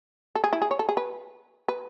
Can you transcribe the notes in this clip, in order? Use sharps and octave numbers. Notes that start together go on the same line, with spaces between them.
A4
G#4
E4
G#4
C#5
A4
G#4
B4
B4